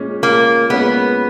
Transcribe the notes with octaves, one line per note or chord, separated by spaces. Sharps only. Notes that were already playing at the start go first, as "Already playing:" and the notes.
Already playing: A#2 G#3 C#4
A#2 A#3
G#3 B3 C#4